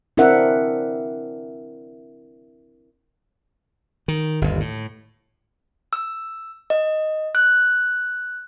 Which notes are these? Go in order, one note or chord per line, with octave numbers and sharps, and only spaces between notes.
C4 D4 E4 A#4 E5 F#5
D#3
G1 D#2
A2
E6
D#5
F#6